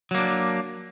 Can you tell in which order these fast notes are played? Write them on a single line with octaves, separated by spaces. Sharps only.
F#3 A#3 D4